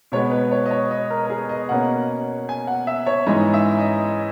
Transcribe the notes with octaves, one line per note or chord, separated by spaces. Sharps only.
B2 G#3 B3 C#5
B4
C#5
D#5
C#5
D#5
A#4
A#4
G#4
D#5
B2 A#3 C#4 F#5
G#5
F#5
E5
C#5
G#2 E3 G#3 C#4 D#5
E5
D#5